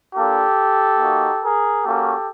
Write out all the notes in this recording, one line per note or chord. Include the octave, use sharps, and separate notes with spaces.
A#3 D4 F4 G4 A4
A#3 D#4 F#4
G#4 A#4
A#3 C#4 F#4 G4 A4